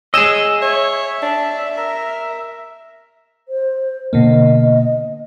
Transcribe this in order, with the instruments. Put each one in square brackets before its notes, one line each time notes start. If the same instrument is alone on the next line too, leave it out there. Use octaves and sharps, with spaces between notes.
[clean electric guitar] G#4 D#5 [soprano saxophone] C#5 [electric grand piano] E6 E7
[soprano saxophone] C#5 [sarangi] E5
[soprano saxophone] D4
A#4
[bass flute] C5
[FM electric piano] B2 D3 A#3 [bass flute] D#5